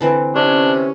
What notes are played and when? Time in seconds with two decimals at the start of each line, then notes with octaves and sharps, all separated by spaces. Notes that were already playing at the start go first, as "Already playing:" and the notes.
0.01 D3 E3 C4
0.35 C3 C#4 D4